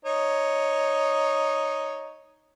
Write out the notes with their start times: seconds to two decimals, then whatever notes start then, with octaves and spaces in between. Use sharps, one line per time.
0.05 D#4 C#5